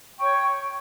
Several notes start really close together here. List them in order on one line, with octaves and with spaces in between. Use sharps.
G5 C#6 C#5